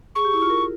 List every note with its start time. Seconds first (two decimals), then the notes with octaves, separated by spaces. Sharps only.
0.15 G#4 C#6
0.25 G4
0.33 E4
0.42 F4
0.50 A#4